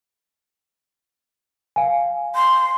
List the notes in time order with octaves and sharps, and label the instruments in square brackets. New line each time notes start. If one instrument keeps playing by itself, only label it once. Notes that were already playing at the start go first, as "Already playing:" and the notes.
[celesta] F5 G#5
[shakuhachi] C6